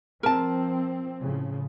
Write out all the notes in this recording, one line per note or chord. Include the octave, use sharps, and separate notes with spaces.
F3 C4 A#4 A5
A2 C#3 F3